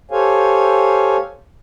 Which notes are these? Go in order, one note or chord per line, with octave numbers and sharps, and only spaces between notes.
G4 A4 C5 C#5 F5 G#5